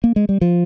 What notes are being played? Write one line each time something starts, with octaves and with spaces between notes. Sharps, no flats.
A#3
G#3
G3
F3